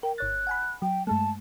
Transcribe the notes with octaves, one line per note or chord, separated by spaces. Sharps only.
A#4 G5
G1 C#5 F#6 A6
F#5 G#5 B5
F#3 G5
G2 G#3 A3 A5